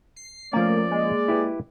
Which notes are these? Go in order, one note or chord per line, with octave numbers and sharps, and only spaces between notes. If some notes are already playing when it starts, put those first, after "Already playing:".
C7
F3 A3 A#3 C#4 D5
G#3 A#3
E4 G4 B4